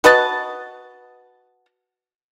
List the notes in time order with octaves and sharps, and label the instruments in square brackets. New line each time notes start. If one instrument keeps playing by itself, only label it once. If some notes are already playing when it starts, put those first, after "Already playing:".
[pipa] F#4 B4 D#5 A5